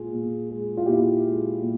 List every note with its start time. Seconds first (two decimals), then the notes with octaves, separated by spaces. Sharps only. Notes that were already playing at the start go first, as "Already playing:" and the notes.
Already playing: A#2 G#3 F4 G#4
0.13 A#2
0.50 G#3
0.77 F4
0.86 A#2 E4 G4
1.24 G#3
1.62 A#2